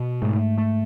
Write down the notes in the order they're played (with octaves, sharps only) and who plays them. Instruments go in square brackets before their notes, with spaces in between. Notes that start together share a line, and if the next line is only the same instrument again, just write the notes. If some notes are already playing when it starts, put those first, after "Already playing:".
Already playing: [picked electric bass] B2
[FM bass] G#2 [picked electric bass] A3
[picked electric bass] A3